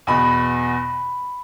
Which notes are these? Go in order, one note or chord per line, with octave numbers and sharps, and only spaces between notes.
E2 B2 B5